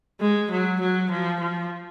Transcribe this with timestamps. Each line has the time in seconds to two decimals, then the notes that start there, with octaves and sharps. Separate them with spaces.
0.20 G#3
0.51 F#3
0.81 F#3
1.10 F3
1.40 F3